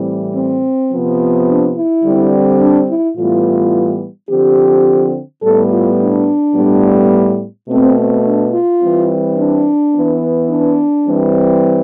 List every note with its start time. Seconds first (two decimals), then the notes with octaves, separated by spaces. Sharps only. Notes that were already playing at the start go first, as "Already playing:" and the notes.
Already playing: A2 E3 G3 C4
0.34 C4
0.91 C3 F3 B3
1.48 D4
1.76 E4
2.04 D3 G3 C4
2.60 D4
2.89 E4
3.17 A2 E3 G3 B3 F4
4.30 D3 F3 C4 G4
5.42 A2 G3 B3 A4
5.71 F4
5.99 D4
6.55 A2 G3 B3
7.68 B2 A3 C4
7.97 C4
8.24 D4
8.52 F4
8.81 E3 G3 C4
9.38 D4
9.94 E3 B3
10.50 D4
11.07 E3 G3 C4